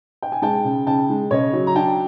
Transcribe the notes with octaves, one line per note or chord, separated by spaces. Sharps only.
G5
G#5
G#3 G5 A5
C#3
C#3 G5 A5
G#3
C#3 C#5 D#5
F#3
A#5
D4 G5 A5